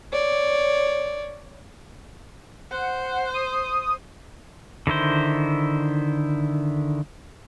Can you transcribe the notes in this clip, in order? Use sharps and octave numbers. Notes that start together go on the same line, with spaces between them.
C#5 D5
C5 F#5
D#6
D3 D#3 E4 C5